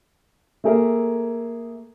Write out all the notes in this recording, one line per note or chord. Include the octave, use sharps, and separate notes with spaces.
A3 A#3 G#4 A#4 E5